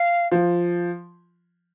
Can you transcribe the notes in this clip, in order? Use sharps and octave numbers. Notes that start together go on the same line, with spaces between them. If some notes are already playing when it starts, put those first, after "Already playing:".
Already playing: F5
F3